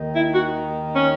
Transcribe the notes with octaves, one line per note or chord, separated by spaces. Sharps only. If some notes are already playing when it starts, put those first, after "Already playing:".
Already playing: D#2 D#3
E4
F#4
C#4